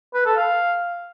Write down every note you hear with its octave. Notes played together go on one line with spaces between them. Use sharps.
B4
A4
F5